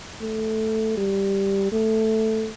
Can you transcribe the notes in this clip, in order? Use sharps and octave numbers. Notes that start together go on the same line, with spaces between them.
A3
G3
A3